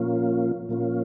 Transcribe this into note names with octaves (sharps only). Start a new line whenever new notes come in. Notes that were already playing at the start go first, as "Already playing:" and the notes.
Already playing: A#2 F3 A#3 C#4 F4
A#2 F3 A#3 C#4 F4